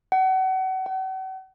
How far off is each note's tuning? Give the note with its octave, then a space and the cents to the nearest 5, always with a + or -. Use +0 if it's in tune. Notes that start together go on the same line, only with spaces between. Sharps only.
F#5 +35
F#5 +45